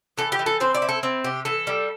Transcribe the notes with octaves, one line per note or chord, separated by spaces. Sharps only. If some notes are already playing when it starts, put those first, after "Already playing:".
E3 A4
G4
E3
A4
C4 C5
D5
E4
A4
C4
C3 G4
E3 A4
G3